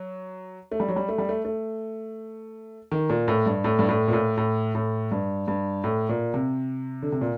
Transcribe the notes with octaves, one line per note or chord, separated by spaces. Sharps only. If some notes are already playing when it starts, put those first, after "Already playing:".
Already playing: F#3
A3
G3
F#3
G3
A3
G3
A3
A3
D#3
A#2
A2
G2
A2
G2
A2
A#2
A2
A2
A2
G2
G2
A2
A#2
C3
D3
C3
A#2